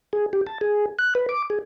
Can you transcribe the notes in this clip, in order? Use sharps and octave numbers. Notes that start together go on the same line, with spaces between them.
G#4
G4
A5
G#4
F#6
B4
D6
G#4